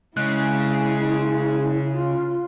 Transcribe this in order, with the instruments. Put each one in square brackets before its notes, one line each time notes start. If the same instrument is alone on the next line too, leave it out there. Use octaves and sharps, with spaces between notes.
[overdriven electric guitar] C#3 [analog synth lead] G#3 [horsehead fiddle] E4 [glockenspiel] F#6
[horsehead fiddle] F4